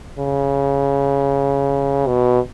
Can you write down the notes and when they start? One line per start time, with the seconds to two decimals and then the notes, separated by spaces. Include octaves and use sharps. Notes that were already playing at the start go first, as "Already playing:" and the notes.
0.19 C#3
2.07 B2